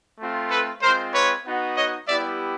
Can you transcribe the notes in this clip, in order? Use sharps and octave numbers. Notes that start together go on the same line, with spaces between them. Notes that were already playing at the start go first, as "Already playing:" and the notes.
A3 C4 F4
A4 B4
G#3 C4 F4 A#4 C5
B4 C#5
B3 D#4 F#4
C#5 D#5
G3 B3 E4 G4 D5 E5